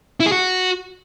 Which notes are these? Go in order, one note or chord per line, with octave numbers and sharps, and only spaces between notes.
E4
G#4
F#4